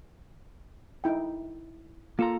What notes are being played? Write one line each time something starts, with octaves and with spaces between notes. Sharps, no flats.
D#4 E4 G5
A#3 F4 A4 A#5